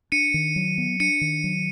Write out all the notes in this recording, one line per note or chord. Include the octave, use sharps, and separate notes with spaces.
D4 C#7 D#7
D#3
F#3
B3
D4 C#7 D#7
D#3
F#3